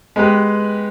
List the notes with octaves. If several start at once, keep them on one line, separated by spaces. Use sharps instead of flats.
G#3 B3 G4 B4